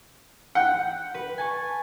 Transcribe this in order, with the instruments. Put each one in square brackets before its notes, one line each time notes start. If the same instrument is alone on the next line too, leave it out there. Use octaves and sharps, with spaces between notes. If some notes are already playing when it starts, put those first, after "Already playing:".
[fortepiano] F#5 [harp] G5
[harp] B4
G#5 A5 C#6